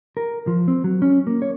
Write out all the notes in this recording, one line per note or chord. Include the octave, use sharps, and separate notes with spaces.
A#4
F3
C4
F#3
C#4
A#3
C#5